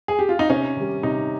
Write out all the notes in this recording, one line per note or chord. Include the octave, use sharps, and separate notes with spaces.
G#4
G4
F4
D#4
C3 C#4
D#3 G3
C3 D#4